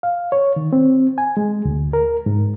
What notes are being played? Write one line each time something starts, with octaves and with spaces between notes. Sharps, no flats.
F5
C#5
D#3
C4
G#5
G#3
D2
A#4
G#2